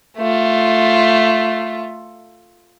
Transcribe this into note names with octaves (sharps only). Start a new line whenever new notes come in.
A3 F4